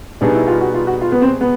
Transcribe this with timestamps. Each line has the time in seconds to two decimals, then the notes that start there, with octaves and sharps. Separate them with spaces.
0.21 B2 G3 B3 D4 D#4 G#4
0.35 E4
0.47 F4
0.61 F#4
0.74 F4
0.87 F#4
1.01 F4
1.12 B3
1.21 C4
1.41 B3